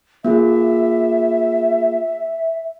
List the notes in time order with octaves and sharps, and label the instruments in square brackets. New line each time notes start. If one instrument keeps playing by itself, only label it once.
[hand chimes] A#3 F4 G#4 [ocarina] E5